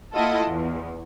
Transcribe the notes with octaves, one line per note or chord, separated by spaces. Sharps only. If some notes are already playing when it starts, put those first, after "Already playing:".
A#3 E4 F4 A4 D#5 F#5
E2